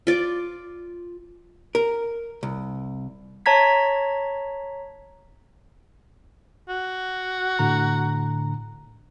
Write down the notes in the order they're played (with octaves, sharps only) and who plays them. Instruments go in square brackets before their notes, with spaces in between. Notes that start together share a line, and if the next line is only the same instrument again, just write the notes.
[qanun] F4 D5
[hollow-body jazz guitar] A#4
C2
[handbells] C#5 A5 A#5 G#6 B6
[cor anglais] F#4
[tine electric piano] A2 D3 A#5